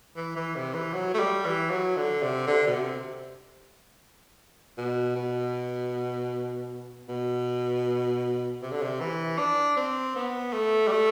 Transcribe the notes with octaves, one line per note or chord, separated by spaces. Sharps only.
E3
E3
C3
E3
F#3
A3
G3
E3
F#3
D3
C3
D3
B2
C3
B2
B2
B2
C3
D3
C3
E3
D4
C4
B3
A3
G3
A3